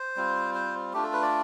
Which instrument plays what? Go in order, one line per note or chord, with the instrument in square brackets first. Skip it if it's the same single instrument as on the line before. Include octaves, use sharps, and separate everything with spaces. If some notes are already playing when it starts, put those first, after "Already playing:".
Already playing: [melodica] C5
G3 C4 F4
C5
A3 D4 F4 G4
A4
B4
D5